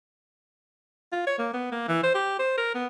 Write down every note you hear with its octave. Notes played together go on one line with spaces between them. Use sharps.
F4
C#5
A#3
B3
A#3
E3
C5
G4
C5
A#4
B3